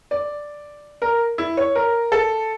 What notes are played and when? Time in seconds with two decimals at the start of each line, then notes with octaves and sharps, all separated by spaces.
0.11 D5
1.02 A#4
1.38 E4
1.57 C#5
1.75 A#4
2.12 A4